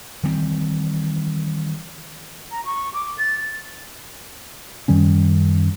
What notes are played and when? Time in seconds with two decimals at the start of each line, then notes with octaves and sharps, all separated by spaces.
0.23 D#3 E3 G3 C4
2.51 A#5
2.65 C#6
2.94 D6
3.18 A6
4.88 F#2 D#3 G3 C#4